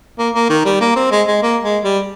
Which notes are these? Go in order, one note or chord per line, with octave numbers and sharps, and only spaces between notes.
A#3
A#3
D#3
G3
A#3
C4
G#3
G#3
A#3
G#3
G3